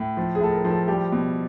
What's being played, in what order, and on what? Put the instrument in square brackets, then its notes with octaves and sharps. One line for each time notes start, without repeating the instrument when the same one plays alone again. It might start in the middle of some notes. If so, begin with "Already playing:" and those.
Already playing: [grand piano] A2
F3
G#4
A2 A4
A#4
F3
A4
G3 G4
B2